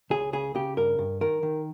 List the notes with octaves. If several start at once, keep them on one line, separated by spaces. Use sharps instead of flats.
C#2 G#4
C#3 G#4
C#3 G4
G2 A#4
G2
D#3 A#4
D#3